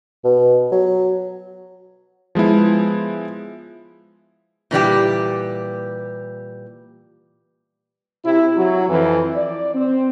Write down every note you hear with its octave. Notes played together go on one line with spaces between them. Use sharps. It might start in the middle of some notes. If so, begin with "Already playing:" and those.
B2
F#3
F3 G#3 B3 E4
A#2 E3 G3 G4
C3 E4
F#3
F2 E3
D5
C4